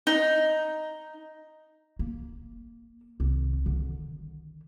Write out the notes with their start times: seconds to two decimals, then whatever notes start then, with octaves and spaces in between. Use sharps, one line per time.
0.07 D#4
1.99 A#3
3.20 C2 D#3
3.66 D3 D#3